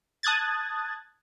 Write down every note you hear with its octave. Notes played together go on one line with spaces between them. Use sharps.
A5 D#6 F#6 G#6 A6